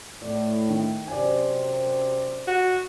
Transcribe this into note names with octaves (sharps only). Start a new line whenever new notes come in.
A2 D5
D#3
F#2 C3 C5 D5 G#5
F#4